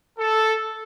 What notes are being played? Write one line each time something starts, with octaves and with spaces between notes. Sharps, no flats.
A4